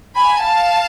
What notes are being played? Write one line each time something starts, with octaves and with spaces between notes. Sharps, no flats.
G#5 B5
F5 A5